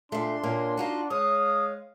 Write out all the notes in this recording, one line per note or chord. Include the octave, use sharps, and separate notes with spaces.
A#2 A3 D4 C6
A#2 A#3 C#4
D#4 F4 F#4
G#3 G#4 C#5 F5 D#6